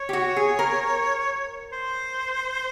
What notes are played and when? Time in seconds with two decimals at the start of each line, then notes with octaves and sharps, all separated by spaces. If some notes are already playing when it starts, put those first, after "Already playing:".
Already playing: C#5
0.09 G4
0.13 F#4
0.36 G#4
0.59 A#4
1.73 C5